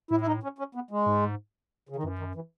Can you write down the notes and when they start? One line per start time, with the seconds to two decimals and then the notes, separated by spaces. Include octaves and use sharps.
0.11 A2 E4
0.21 E4
0.27 D#4
0.43 C#4
0.58 C#4
0.75 B3
0.91 G#3
1.06 G#2
1.89 C#3
1.96 D#3
2.03 F#2 E3
2.19 D#3
2.35 E3